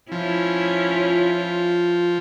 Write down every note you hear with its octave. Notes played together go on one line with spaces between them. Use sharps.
F3 C#4 E4
F4